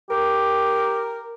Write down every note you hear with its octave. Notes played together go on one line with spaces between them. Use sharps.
G4 A#4